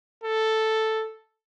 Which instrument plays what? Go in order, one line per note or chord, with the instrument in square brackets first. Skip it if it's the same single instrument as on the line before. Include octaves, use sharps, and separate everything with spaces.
[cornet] A4